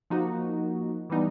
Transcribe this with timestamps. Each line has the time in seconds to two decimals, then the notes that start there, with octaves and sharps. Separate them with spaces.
0.10 F3 A#3 D#4 F#4
1.10 E3 G3 B3 D#4